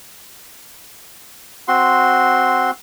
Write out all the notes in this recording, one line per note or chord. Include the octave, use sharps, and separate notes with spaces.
C4 F#4 C6